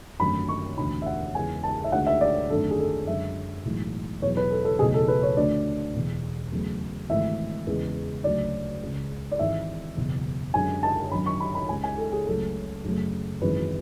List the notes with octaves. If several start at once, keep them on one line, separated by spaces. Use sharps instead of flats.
G#1 F#2 D3 A3 B5
C#6
E1 D2 D3 B5
E5
F#5
E2 C#3 G#3 G#5
A5
E5
D2 D3 G#3 F#5
E5
D5
G#1 F#2 D3 A3 A4
G#4
A4
F#2 D3 G#3 E5
B1 A2 E3 G#3
E2 B2 F#3 C#5
B4
A4
A4
F#1 E2 B2 F#3 A3 G#4
A4
B4
C#5
D2 D3 A3 D5
E1 E2 B2
E2 C#3 F#3 A3
G#1 G#2 E3 A3 E5
E2 C#3 G#3
D2 C#3 F#3 A3 D5
C#2 C#3 G#3
D5
G#1 G#2 E3 G#3 E5
F#1 E2 B2
F#2 D3 G#3 G#5
A5
G#1 F#2 D3 F#3 B5
C#6
B5
B5
C#2 C#3 G#3 G#5
G#5
A4
G#4
C#2 C#3 F#3 A3 A4
F#2 C#3 F#3 A3
G#1 F#2 E3 G#3 B4